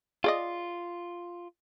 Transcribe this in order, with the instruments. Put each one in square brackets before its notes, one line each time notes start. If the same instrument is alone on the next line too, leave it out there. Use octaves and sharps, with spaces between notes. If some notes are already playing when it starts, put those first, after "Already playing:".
[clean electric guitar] F4 [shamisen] G#4 D5 D#5